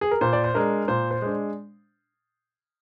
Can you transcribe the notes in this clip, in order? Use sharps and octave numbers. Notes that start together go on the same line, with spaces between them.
G#4
A#4
A#2 C5
D5
C5
G#3 D4 A#4
A#2 C5
C5
G#3 D4